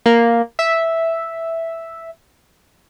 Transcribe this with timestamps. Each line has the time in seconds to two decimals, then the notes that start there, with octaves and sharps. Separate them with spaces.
0.06 A#3
0.59 E5